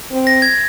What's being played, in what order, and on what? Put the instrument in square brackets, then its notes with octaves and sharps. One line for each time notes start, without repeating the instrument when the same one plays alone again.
[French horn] C4
[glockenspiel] A#6
G#6